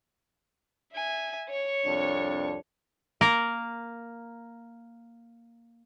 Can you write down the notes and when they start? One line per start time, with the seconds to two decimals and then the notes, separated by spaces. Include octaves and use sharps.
0.94 E5 G#5
1.49 C#5 C#6
1.84 C2 F2 D4
3.21 A#3 A#4